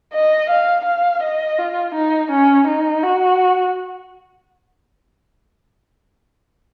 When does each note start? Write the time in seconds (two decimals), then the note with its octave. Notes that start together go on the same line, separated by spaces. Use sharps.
0.13 D#5
0.50 F5
0.85 F5
1.22 D#5
1.58 F4
1.95 D#4
2.31 C#4
2.67 D#4
3.03 F#4